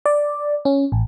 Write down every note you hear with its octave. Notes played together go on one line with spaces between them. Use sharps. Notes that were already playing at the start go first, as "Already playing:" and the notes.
D5
C#4
A1